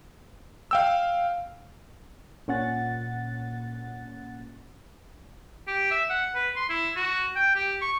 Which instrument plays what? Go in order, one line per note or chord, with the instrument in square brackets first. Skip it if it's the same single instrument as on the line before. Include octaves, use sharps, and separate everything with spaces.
[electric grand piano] F5 G5 E6
[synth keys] A#2 C#4 F#5 A6
[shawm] G4
E5
F#5
B4
C6
E4
F#4
G5
G4
C#6